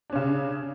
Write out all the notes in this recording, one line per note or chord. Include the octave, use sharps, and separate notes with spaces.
C#3 C#4 D4